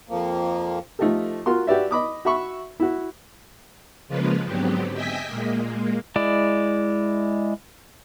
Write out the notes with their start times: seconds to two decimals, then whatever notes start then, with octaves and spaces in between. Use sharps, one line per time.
0.09 F2 F3 A#3
0.99 F3 A3 D#4 F4 G4 A4
1.46 F4 F#4 A#4 C6
1.67 F#4 G4 B4 D5 E5
1.91 D#5 B5 D6 D#6
2.25 F#4 E5 B5 C#6
2.80 E4 F#4
4.08 C#3 F3 G#3 A#3 F4 B4
4.45 G#2 D3 F#3 B3 C4 G4
4.93 D#5 E5 G5 G#5 B6
5.27 A#2 G#3 A#3
6.16 G#3 E4 D5